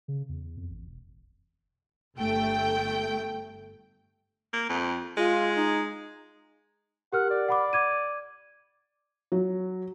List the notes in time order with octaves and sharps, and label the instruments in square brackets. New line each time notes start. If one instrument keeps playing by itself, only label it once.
[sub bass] C#3
E2
F2
A1
E1
[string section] G1 A3 G5
[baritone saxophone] A#3
F2
[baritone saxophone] G#3 [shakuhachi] F4
[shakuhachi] D#4
[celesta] G4 A#4 F6 [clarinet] F#5
[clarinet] D5
[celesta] F#5 B5 D6
D6 G#6 D#7
[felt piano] F#3